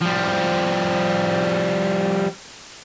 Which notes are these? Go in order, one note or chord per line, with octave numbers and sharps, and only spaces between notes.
F3 G3